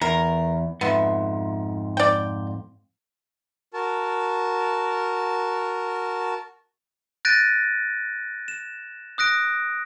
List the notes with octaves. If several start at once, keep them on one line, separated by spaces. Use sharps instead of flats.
E2 A#4
F2 G#2 B3 E5
D5 G5
F#4 A#4 A5
F#6 G6 A6 A#6 D7 D#7
E7
D#6 F#6 A#6 D7